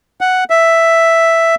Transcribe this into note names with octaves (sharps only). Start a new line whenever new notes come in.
F#5
E5